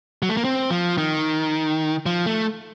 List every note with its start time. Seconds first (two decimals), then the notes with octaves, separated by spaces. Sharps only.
0.22 F#3
0.29 A3
0.37 A#3
0.44 C4
0.71 F3
0.98 D#3
2.06 F3
2.26 A3